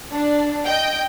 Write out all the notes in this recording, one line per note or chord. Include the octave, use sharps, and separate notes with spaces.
D4
D#5 G5